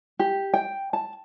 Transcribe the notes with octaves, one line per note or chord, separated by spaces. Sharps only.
G4
G5
A5